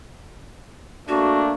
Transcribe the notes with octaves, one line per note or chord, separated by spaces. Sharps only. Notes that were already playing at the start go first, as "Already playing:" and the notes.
A3 A#3 D4 F#4